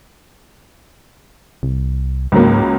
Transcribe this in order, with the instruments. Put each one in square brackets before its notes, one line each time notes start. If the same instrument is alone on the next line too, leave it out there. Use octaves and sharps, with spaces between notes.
[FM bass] C2
[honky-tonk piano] C#2 F#3 A#3 [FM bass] G#2